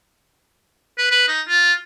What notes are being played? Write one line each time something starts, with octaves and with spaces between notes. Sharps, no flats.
B4
B4
D#4
F4